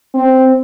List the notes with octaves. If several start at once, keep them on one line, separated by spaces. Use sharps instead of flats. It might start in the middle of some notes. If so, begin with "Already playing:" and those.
C4